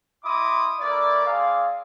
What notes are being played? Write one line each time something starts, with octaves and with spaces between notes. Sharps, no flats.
E4 D#5 B5 C6 D6 D#6
A3 E4 A#4 D5
C4 G#4 D5 F5